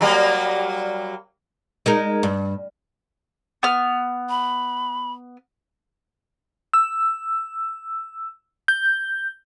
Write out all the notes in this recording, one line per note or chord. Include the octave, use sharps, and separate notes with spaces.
F#3 G3 A#3
G#3 D#4 A#4
G2
B3 F6
B5
E6
G6